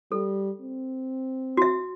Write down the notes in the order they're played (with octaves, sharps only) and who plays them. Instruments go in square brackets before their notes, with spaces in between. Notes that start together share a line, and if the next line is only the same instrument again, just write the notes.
[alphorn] G3 [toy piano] A4
[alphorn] C4
[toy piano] F#4 E5